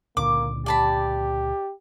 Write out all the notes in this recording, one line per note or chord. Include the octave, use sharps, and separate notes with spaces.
C#2 A#2 D3 A#3 D6
G4 D5 A5 B5